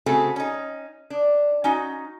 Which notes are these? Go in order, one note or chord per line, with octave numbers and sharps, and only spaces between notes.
C#3 A3 C4 F#4 G#4 A4
C#4 D#4
D4
C#4 D#4 F#4